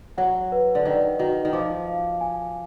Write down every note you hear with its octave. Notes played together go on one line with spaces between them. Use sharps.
F#3 F#5
B4
D3
D#3 D5
D#3 F#4
D#3
F3 D6
F5
G#5